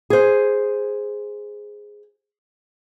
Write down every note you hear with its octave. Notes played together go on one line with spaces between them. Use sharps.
G#4 C5